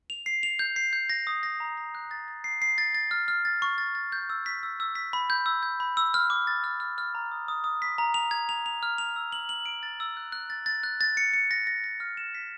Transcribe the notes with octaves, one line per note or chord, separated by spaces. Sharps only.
F7
C7
F7
G6
C7
G6
A#6
D#6
A#6
A#5
A#6
F#6
A6
A6
C7
C7
A6
A6
F6
F6
A6
C#6
A6
A6
G6
E6
B6
E6
E6
B6
B5
G6
E6
G6
B5
E6
F6
D6
A6
F6
F6
F6
A#5
D#6
D#6
D#6
B6
A#5
F7
G#6
F7
F7
F6
F7
E6
F#7
F#7
D7
A6
E6
F#6
F#6
A6
A6
F#6
A6
C#7
C#7
A#6
A#6
A#6
F6
E7
B6